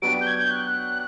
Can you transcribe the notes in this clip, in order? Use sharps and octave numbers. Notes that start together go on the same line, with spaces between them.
F#3 B3 D4 G4 D7
G6
G#6
G6
F#6